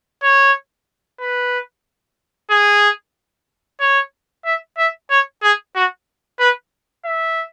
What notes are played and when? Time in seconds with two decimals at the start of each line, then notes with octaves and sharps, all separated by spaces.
0.23 C#5
1.20 B4
2.51 G#4
3.80 C#5
4.45 E5
4.78 E5
5.10 C#5
5.42 G#4
5.75 F#4
6.39 B4
7.05 E5